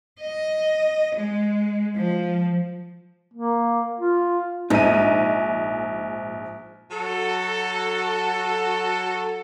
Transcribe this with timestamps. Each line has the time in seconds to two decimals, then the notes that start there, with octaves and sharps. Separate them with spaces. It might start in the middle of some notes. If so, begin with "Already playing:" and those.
0.20 D#5
1.15 G#3
1.96 F3
3.34 A#3
4.00 F4
4.70 A#1 G#2 D#4 D#7
6.91 F#3 F#4 A4